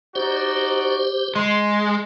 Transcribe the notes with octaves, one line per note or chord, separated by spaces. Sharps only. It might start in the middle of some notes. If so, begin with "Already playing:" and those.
D#4 F#4 G4 C5 D5
G#3 C6